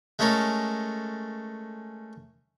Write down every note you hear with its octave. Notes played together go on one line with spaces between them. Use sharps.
G#3 A3 C#4 A4 A#4